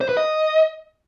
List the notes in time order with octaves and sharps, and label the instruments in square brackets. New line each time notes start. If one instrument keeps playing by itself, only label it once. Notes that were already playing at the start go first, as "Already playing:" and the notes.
[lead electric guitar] C5
B4
D#5